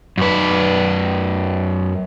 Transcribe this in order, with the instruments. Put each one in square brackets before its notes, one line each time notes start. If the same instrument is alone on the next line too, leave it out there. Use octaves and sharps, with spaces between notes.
[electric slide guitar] F#2 B4